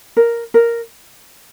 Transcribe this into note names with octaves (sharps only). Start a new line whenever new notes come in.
A#4
A#4